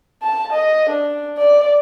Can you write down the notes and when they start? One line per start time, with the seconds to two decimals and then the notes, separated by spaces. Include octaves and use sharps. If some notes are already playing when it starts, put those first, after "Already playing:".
0.23 A5
0.53 D#5
0.89 D4
1.38 D5